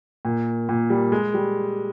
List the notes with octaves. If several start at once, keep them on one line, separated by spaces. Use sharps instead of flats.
A#2
A#2
G3
G#3
G3